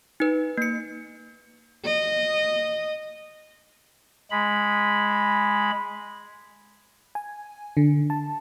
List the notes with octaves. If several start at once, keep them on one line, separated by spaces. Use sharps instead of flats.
D#4 B4
A#3 C#7
D#5
G#3 B5
G#5
D3
A5